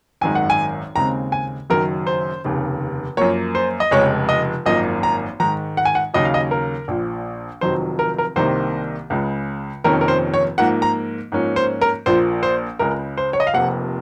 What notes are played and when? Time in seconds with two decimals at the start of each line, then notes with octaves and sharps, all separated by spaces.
0.21 G#1 F#2 D#3 G#3 G#5
0.35 F#5
0.50 G#5
0.95 D#2 C#3 G#3 C4 A#5
1.32 G#5
1.70 F#1 F#2 D#3 F#3 A#4
2.07 C5
2.44 F1 D#2 C#3
3.17 F#2 F3 A#3 C#5
3.55 C5
3.80 D#5
3.91 F1 F2 C#3 F3 G#3 C#5
4.29 D#5
4.65 G#1 F#2 F3 A#3 D#5
5.03 A#5
5.40 G#2 D#3 G#3 A#5
5.77 F#5
5.85 G#5
5.95 F#5
6.14 D#2 C#3 F#3 C#4 D#5
6.25 F5
6.34 D#5
6.51 A#4
6.88 A#1 A#2 F3
7.61 F1 F2 D#3 F#3 C5
7.99 A#4
8.18 A#4
8.36 C2 C3 D#3 A#3 C5
9.10 C#2 C#3 G#3
9.84 F1 F2 D#3 A#3 C#4 A#4
10.01 A#4
10.08 C5
10.34 C#5
10.58 G#2 F3 A#3 F#5
10.82 A#5
11.32 G#2 F3 A#3 C#4
11.56 C5
11.81 A#4
12.06 A#1 A#2 F3 A#3 C5
12.43 C5
12.79 C#2 C#3 G#3 A#4
13.18 C5
13.33 C#5
13.40 D#5
13.47 F5
13.53 F1 F2 C3 F3 A#3 F#5